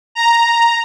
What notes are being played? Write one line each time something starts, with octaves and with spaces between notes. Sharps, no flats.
A#5